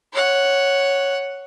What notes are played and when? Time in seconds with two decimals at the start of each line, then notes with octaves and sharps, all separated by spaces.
0.13 C#5 F#5